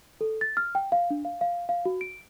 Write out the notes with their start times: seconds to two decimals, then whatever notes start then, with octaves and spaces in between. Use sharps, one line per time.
0.21 A4
0.41 A6
0.57 F6
0.75 G5
0.92 F5
1.10 D4
1.25 F5
1.41 F5
1.69 F5
1.85 F#4
2.01 D7